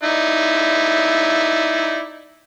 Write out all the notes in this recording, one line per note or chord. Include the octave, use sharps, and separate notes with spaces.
D#4 E4 D5